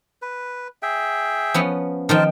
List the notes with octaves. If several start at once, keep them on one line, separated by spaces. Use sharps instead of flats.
B4
G#4 E5 G5
F3 B3 C#4
D#3 F3 A#4 C5 G5 A5